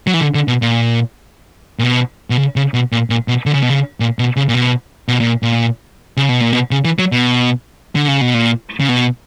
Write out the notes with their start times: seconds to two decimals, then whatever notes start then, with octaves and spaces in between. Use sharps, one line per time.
0.07 F#3
0.14 E3
0.21 D3
0.34 D3
0.48 B2
0.62 A#2
1.79 A#2
1.83 B2
2.30 B2
2.38 C#3
2.56 C#3
2.74 B2
2.92 A#2
3.10 A#2
3.28 B2
3.46 D3
3.54 C#3
3.62 B2
3.70 C#3
4.00 A#2
4.19 B2
4.36 C#3
4.49 A#2
4.54 B2
5.08 B2
5.20 A#2
5.43 A#2
6.17 C#3
6.29 B2
6.41 A#2
6.53 B2
6.71 C#3
6.85 E3
6.99 F#3
7.12 B2
7.95 D3
8.08 C#3
8.21 B2
8.34 A#2
8.80 C#3
8.88 B2